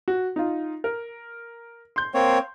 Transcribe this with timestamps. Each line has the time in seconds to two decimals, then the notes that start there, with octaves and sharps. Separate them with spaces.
0.08 F#4
0.36 D#4 F4
0.84 A#4
1.96 C6 G6
2.14 A#3 C4 C#5